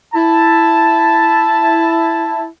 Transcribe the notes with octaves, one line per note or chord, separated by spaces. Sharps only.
E4 A5